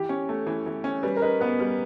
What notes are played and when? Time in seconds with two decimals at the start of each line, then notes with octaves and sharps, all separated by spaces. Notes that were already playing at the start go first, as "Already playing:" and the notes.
Already playing: E3 G4
0.09 C#4
0.29 A3
0.47 E3
0.66 E3
0.84 C#4
1.03 G3 B4
1.17 A#4
1.22 D#4 B4
1.40 B3 B4
1.59 G3 B4